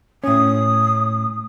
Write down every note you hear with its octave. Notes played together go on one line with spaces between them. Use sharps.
A2 C#4 D#6